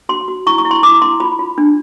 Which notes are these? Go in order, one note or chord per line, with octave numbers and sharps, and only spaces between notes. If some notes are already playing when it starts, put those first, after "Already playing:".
F#4 C6
F#4
E4 C#6
C#6
E4
C6
E4 D6
E4 C6
F4 B5
F4
D4